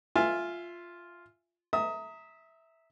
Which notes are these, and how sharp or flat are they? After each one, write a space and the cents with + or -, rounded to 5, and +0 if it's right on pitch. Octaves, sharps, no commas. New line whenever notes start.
F4 +0 E5 +20 G#5 +0
E5 -10 A#5 -15 D#6 +20